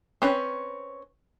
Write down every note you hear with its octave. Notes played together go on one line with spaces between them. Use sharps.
C4 C#4 B4